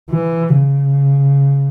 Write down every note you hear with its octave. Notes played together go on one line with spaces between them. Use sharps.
E3
C#3